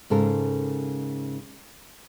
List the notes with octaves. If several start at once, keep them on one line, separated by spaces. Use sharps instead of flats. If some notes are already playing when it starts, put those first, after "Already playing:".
G#2 C#3 A4 A#4